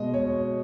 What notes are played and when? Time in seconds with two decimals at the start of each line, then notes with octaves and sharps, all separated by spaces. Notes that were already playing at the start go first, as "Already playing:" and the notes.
Already playing: B2 G#3 D#5
0.14 C#5